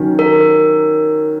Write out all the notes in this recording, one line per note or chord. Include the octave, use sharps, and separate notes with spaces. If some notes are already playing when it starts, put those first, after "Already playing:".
Already playing: D#3 F#3 C#4
A#4